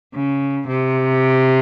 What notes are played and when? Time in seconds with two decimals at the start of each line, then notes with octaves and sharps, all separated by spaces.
0.13 C#3
0.67 C3